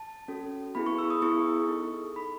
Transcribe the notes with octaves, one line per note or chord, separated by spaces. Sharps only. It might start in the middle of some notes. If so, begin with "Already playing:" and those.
Already playing: A5
C#4 F#4 A4
B3 E4 G#4 B5
C#6
E6
D#6
B3 E4 G#4 C#6
D#4 A4
D#4 A4 B5